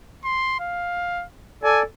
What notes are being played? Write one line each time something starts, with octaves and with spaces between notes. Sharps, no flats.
C6
F5
A4 D5 G#5